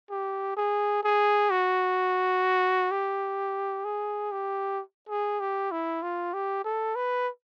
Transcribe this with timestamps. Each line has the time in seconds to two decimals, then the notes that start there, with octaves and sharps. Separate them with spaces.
0.10 G4
0.57 G#4
1.04 G#4
1.51 F#4
2.92 G4
3.85 G#4
4.32 G4
5.09 G#4
5.40 G4
5.72 E4
6.02 F4
6.34 G4
6.65 A4
6.96 B4